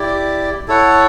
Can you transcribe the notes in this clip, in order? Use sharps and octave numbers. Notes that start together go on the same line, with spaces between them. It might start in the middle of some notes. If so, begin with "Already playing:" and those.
Already playing: E4 G4 D5
E4 A4 C#5 F#5